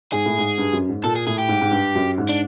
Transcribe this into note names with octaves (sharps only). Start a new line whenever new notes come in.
G#2 G#4
A2
G#2
G2
F#2
G#2
A#2 A4
G#4
A2 G#4
G4
G#2
G#2
G2
F#2
G#2
D4